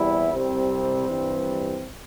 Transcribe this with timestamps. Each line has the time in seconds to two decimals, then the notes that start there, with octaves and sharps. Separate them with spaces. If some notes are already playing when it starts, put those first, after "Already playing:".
Already playing: E2 C3 G3 E4
0.33 C2 C3 G3 C4
1.08 G2 E3 G3